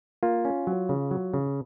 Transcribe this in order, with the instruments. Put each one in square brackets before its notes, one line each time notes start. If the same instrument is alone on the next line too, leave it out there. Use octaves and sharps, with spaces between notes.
[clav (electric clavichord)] A#3 F4
C#4
F#3
C#3
F#3
C#3